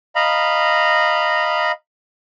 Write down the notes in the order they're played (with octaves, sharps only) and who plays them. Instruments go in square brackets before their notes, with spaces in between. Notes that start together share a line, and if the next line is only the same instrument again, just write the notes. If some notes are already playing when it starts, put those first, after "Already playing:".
[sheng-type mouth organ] D#5 F5 A#5 B5